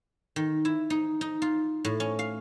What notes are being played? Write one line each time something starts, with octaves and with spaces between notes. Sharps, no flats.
D#3
E4
D#4
D#4
F4
A2
C#4
F5